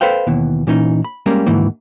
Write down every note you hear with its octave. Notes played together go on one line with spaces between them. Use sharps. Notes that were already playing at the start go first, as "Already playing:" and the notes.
A4 B4 C5 F5 G5
D#2 B2 E3
A#2 E3 C#4 D#4
B5
G3 G#3 A#3 C#4
D2 G#2 D#3 E3 A#3